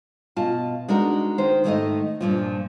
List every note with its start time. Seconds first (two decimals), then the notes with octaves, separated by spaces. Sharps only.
0.36 B2 F4 A5
0.88 G#3 D4 D#4 F#4 A#4
1.38 D#3 C5
1.64 G#2 D#3 G3 A3 D#4 D#5
2.21 G2 A#2 F3